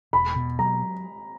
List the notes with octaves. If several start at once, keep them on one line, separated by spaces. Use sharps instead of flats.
E1 B5
B2
F#3 A#5